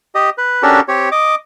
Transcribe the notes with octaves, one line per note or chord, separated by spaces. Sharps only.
G4 D#5
B4
C#4 D4 F#4 G4 A4 A#4
C4 G4 C#5
D#5 D6